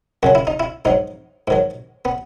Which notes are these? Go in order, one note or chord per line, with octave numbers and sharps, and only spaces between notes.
F#2 C#3 F#3 F#4
E4
D#4
E4
G#2 F#3 D#4
G#2 D#3 F#3
B3